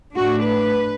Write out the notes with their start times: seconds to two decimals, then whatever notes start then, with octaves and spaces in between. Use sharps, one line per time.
0.14 A2 A3 D4 F#4
0.43 B4